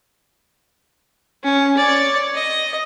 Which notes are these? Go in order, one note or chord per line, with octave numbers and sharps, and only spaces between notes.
C#4
C#5 D5
D#5